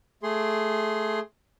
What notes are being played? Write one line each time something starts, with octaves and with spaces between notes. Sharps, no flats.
A3 G#4 C6